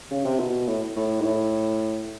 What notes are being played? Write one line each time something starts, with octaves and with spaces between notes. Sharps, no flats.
C#3
C3
B2
A2
A2
G#2
A2